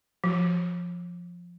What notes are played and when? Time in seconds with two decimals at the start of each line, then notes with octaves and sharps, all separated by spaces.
0.24 F3